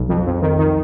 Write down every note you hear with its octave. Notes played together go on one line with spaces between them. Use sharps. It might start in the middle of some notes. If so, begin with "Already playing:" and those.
Already playing: B1
F2
F2
D#3
D#3